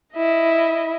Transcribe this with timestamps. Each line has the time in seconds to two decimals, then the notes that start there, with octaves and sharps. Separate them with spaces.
0.15 E4 D#5